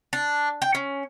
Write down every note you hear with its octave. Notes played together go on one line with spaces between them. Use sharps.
D4
G5
C#4